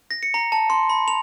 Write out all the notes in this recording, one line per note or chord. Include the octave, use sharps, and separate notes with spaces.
A#6
C#7
A#5
A5
C6
B5
F7